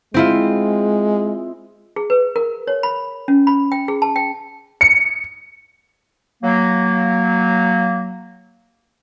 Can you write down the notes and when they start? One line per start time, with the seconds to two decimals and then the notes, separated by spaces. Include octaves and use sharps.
0.14 G#3 C4 E4 F4
1.96 G#4
2.10 B4
2.36 A#4
2.67 C#5
2.83 B5
3.28 C#4
3.47 B5
3.72 G5
3.88 G#4
4.02 A5
4.16 G5
4.81 C#7
6.43 F#3 A#3